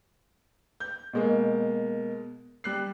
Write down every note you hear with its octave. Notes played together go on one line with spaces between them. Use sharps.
G6
B2 G#3 A#3
G3 F#6 C7